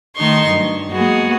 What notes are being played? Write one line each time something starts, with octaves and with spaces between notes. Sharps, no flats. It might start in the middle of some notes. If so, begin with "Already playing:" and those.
D#3 A3 D#4 C6 C#6
G2 F#3
G#3 A#3 B3 F#4 G#4